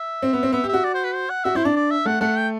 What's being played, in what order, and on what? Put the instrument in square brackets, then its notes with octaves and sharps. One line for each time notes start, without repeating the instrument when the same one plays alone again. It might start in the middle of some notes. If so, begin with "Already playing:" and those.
Already playing: [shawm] E5
[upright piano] C4
B3
C4
[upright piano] B3 [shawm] E5
[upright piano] G4
[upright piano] F#4 [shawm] E5
[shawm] D5
C5
B4
C5
F#5
[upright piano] F#4 [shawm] E5
[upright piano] E4 [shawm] C5
[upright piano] D4 [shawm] D5
[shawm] D5
E5
[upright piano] A3 [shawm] F#5
[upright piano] A3 [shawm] F#5
[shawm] G5